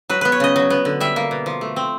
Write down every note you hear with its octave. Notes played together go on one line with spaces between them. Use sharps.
F#3 B4
B3 B4
C#5
C#3 D#5
F#3
B3
D3
G3 E5
A#3
B2
F3
A3
C4